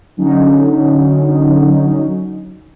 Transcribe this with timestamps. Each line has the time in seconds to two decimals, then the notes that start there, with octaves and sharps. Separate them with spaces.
0.17 D3 F#3 C#4 D#4